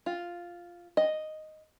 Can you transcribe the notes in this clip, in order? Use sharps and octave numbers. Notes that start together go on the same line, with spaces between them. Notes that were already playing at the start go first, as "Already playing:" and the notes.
F4
D#5